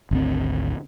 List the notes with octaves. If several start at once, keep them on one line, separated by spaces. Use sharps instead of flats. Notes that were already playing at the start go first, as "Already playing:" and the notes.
G#1 D2 C4